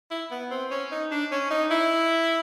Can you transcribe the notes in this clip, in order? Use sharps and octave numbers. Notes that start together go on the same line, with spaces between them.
E4
B3
C4
C#4
D#4
D4
C#4
D#4
E4